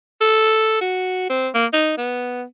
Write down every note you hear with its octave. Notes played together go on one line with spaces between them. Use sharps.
A4
F#4
C4
A#3
D#4
B3